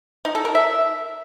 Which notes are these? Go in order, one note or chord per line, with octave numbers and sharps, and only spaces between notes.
D#4
A4
A#4
E5